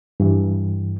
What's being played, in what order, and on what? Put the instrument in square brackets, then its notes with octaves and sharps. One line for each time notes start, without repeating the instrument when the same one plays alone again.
[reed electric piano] G2 E3